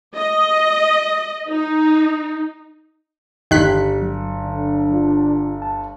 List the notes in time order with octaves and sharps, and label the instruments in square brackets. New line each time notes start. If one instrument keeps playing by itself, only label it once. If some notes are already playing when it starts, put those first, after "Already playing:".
[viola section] D#5
D#4
[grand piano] G1 [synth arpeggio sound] D#3 F#6 B6 [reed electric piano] G4
[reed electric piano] F#3
[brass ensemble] D3 D4
[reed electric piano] F4
A5